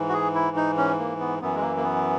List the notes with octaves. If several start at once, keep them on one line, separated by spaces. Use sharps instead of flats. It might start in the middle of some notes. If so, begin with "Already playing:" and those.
Already playing: G#2 E3
F#4
G#4
E4
D#4
C#4
A#3
B3
F#2 E3 B3
G#3
A#3
A#3
B3